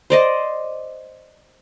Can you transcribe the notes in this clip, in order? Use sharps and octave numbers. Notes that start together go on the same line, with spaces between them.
C5 D5 D#5